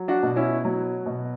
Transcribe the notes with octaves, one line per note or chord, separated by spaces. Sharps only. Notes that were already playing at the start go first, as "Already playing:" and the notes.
Already playing: F#3
D4 F#4
B2
C#4 E4
F#3
B2